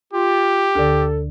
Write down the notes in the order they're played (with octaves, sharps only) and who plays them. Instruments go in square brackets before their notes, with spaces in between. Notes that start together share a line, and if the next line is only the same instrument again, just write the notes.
[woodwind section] F4 [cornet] G4
[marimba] D2 D3 [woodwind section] A4